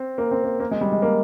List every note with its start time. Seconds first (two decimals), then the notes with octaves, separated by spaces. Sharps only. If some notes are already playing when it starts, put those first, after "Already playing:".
Already playing: C4
0.18 A#3
0.31 C4
0.44 A#3
0.60 A#3
0.71 G#3
0.81 G3
0.92 G#3
1.02 A#3